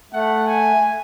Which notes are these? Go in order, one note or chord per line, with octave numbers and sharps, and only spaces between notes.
A3 F#5
G#5